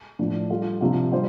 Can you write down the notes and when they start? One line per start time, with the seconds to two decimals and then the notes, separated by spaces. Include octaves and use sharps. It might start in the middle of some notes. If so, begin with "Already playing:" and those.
0.19 A2 F3 D4
0.50 G3 F4 A4
0.81 C3 F3 D4 F4
1.12 G3 F4 C5